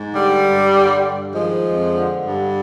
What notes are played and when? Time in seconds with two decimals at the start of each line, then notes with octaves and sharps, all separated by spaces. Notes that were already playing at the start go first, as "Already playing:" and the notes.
Already playing: G#2
0.14 D3 G3
0.45 G2
0.74 D3
1.04 G2
1.34 D#3 F3 G#3
1.63 F2
1.94 D3
2.24 G2